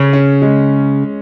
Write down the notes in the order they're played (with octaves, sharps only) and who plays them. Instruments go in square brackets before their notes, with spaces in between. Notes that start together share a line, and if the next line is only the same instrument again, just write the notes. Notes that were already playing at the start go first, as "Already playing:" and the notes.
Already playing: [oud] C#3 [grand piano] C#4
[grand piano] C#4
G#3